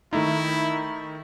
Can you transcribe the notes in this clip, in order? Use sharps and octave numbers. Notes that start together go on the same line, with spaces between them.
D#3 A3 D#4 E4